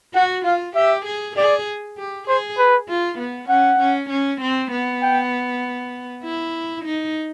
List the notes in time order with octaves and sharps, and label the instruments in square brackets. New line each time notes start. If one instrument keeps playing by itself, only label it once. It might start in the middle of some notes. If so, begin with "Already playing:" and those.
[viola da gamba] F#4 [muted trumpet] F#5
[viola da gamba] F4 [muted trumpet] F5
[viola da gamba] G4 [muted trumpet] E5
[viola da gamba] G#4
[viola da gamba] G#4 [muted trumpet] D5
[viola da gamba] G4
[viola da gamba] G#4 [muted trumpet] C5
[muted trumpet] B4
[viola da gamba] F4
B3
[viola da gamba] C#4 [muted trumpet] F#5
[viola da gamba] C#4
C#4
C4
B3
[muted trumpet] G5
[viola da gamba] E4
D#4